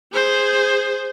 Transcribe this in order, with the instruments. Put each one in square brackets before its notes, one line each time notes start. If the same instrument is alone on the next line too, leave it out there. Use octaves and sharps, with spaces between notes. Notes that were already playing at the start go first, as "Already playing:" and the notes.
[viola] G#4 C5